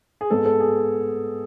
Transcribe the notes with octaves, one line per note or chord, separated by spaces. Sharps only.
G#4
G#2 G#3 B3 A4
A4
G#4